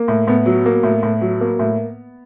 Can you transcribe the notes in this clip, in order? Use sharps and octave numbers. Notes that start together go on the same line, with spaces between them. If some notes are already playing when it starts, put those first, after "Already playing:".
Already playing: A#3
A2
A2 B3
F#3
A#3
A2
A2
F#3
A#3
A2